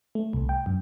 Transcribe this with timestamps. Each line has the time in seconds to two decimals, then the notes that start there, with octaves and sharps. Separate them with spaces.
0.15 A3
0.33 C2
0.49 G5
0.66 F#2